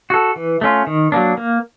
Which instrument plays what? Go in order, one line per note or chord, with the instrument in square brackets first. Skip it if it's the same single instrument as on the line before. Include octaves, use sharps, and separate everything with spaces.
[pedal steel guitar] F#4 A4
E3
A3 C#4 F4
D#3
F#3 A#3 D4
A#3